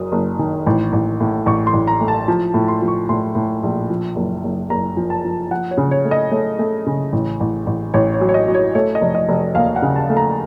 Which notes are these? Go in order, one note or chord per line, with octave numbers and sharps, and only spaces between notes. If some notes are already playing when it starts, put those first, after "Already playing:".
Already playing: F#1 F#3 D#6
F#1
D#3
A1
A1
A2
A1 C#6
C6
A1
A#5
A3
A5
F3 A5
A2
C6
F3
C#6
A2 C6
A2
A#1
F3
F#1
F#1
F#1 A#5
F3
A5
F3
F3 F#5
C#5
C#3
C#5
A3
D#5
A3 C#5
A3
C#3
A1
A1
A1
A1 C#5
C#5
F#3
C#5
D#5
F#3
C#5
A3 C#5
D#5
F1
D#5
F1
D#2 F5
F#5
C#3
A5
A3
A#5